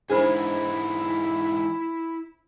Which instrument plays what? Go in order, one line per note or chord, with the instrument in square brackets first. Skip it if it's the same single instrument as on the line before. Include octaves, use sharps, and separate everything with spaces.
[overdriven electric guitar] G#2 E3 [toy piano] D4 C5 B5 [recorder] E4 [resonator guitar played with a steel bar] G#4